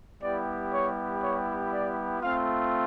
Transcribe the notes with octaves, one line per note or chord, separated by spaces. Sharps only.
G3 B3 E4 G4 D5
C#5
C#5
D5
A3 C4 F4 F5